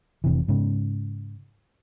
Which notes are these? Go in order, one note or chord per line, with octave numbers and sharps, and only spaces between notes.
F1 C3 E3
G#2 C#3